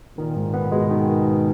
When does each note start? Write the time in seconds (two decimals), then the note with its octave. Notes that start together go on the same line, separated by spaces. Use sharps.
0.18 A#2 D#3
0.36 G#2
0.54 B3
0.72 B2 G#3
0.90 D#3